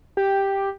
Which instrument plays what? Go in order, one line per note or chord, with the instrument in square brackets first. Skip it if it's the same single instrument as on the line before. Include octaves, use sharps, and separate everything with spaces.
[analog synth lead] G4